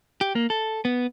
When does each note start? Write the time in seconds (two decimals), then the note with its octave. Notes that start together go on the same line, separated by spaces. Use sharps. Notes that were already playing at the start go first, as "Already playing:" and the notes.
0.21 G4
0.35 A#3
0.50 A4
0.85 B3